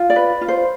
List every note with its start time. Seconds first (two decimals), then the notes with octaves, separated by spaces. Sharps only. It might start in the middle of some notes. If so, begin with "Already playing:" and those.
Already playing: F4
0.10 D5
0.16 B4
0.41 F4
0.48 C5